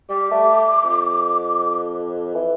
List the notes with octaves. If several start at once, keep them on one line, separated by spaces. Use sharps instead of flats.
G3 D6
A3
F2
E3